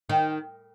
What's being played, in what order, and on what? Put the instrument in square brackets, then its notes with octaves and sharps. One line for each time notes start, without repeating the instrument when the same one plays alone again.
[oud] D#3